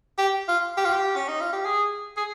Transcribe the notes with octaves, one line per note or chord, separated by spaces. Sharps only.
G4
F4
G4
F4
G4
C#4
D#4
F4
G4
G#4
G#4